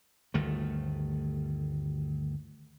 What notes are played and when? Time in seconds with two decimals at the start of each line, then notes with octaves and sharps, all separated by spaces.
0.34 G1 D2 D#3 A3